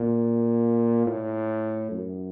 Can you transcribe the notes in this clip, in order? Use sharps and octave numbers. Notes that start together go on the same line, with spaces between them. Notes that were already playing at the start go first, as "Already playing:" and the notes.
Already playing: A#2
A2
F#2